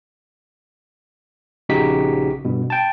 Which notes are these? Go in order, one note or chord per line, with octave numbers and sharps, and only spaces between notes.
A#1 C#3 D#4 F#4 G4 B6
G2 B2
G5 A5